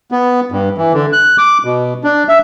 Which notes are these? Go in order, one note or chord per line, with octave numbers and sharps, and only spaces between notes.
B3
G2
E3
D3
F#6
D6
B2
D4
E5